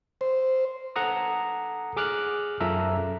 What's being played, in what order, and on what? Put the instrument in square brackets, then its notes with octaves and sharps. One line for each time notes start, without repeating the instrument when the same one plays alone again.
[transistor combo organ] C5
[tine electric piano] A4 F#5 A#5 D#6
G#4 D6 F6 F#6
F#2 F4 A4 E5 A#5